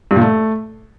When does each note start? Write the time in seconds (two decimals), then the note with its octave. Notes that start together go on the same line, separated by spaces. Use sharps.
0.11 G2
0.16 A#2
0.22 A3